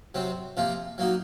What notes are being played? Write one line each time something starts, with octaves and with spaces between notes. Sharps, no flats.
C3 F#3 C4
C3 F3 A#3 F4
F#3 A#3 D#4 F#4